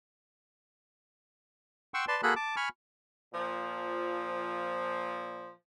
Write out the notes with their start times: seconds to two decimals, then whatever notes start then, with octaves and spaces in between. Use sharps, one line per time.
1.94 F#5 G5 C6 C#6 E6
2.08 B4 D5 A5 C6
2.23 A#3 F#4 G#4 A4 B5 F#6
2.36 A5 D6
2.56 G#5 B5 C#6 F6
3.32 A#2 F3